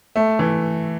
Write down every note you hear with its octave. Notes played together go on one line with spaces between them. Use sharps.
A3
E3